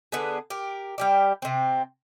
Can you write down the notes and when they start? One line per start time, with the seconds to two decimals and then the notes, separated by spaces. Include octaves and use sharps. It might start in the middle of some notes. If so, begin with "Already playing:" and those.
0.12 D3 B3 D4 G#4
0.50 G4 A#4
0.98 G3 G4 D5
1.42 C3 C4